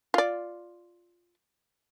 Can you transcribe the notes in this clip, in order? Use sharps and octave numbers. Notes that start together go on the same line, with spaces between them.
F4 D5